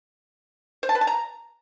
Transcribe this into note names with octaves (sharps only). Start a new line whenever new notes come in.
C5
A5
B4
A5
A#5